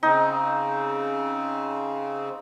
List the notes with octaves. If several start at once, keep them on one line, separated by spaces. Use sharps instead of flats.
C#3 C4 D#4